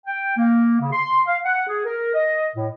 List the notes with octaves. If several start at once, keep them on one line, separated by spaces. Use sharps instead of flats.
G5
A#3
C#3
C6
F5
F#5
G#4
A#4
D#5
A2